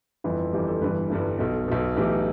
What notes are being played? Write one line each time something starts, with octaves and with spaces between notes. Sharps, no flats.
G1 F2 E3 B4
G1 F2 E3 G4
A4
G1 G2 E3 B4
G1 G2 E3
B1 B2 A4
B1 B2
B1 A2 E3 G4